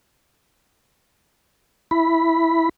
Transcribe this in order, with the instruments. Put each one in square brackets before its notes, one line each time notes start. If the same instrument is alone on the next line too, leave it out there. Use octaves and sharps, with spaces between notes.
[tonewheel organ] E4 B5